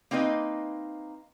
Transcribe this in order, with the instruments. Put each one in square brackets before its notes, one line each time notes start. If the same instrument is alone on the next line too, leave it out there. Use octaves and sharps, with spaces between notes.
[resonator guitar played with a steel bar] A#3 C4 D#4 B4 D#5